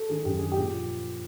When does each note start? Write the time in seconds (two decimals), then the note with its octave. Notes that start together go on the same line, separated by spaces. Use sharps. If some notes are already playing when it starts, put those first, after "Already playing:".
Already playing: A4
0.09 D#3 G#4
0.25 F#2 G4
0.39 D#3 G#4
0.52 G4
0.57 A#2
0.73 F3